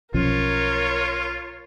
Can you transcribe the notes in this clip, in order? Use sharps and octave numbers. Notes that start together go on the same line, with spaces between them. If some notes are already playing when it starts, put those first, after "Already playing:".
B1 F3 C#4 F4 A#4 C#5